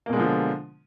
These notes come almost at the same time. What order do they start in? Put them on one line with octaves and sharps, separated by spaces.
A#3 B2 G#3 D3 F3